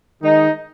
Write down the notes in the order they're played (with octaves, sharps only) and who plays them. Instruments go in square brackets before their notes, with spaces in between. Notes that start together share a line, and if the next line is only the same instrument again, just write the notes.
[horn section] D#3 G#3 D#4